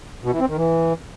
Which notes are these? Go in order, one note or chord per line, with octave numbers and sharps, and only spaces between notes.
B2
E3
C4
D#3
E3